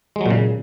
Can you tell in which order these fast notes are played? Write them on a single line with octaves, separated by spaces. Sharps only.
G#3 F#3 A#2 C#3